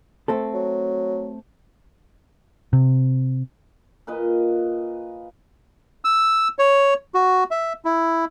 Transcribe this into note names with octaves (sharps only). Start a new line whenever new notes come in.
A3 C4 A4
F#3
C3
A#2 B4 D#5
E6
C#5
F#4
E5
E4